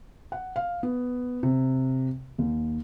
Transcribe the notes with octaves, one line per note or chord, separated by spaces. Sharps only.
F#5
F5
B3
C3
D#2